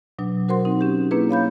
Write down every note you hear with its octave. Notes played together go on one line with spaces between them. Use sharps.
B2 F#3 D4
F#4 A#4 C5 F#5 C6
C4 D#4
C#4 G4
A#3 C#4 D4 E4 G#4 B4
C#5 F5 B5 G6